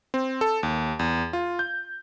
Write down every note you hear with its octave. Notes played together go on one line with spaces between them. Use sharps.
C4
A4
D#2
E2
F4
G6